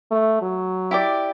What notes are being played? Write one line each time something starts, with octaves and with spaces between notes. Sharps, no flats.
A3
F#3
E4 G4 D5